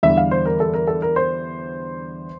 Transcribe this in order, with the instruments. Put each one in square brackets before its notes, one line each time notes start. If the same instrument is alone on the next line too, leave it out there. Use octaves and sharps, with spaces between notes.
[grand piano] E2 D3 G3 E5
F5
C5
A#4
A4
A#4
A4
A#4
C5